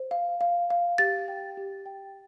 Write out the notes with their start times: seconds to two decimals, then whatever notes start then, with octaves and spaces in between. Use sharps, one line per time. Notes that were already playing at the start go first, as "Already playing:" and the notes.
Already playing: C5
0.11 F5
0.41 F5
0.70 F5
0.98 G4 A6
1.28 G5
1.57 G4
1.86 G5